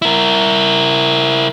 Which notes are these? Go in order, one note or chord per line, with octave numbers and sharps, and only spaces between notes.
E4 A#4